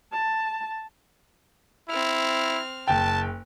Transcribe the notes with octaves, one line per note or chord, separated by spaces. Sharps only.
A5
C4 E4 F6
F#1 G5 A5